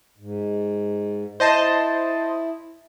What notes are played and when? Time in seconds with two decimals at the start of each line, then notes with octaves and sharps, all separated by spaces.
0.18 G#2
1.40 E4 C5 D#5 A5